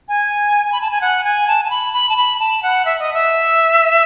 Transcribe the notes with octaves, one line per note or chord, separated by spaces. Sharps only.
G#5
B5
A5
G#5
F#5
G#5
A5
A5
B5
B5
A5
B5
A5
F#5
E5
D#5
E5